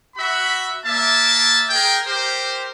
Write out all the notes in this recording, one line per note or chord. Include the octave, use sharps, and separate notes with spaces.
F#4 E5 B5
A#3 D5 E5 A5
G#4 A#4 G5
G4 A#4 C5